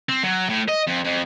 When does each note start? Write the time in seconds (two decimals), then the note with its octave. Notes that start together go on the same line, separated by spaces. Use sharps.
0.09 C4
0.23 F#3
0.49 A2
0.68 D#5
0.87 F2
1.04 F2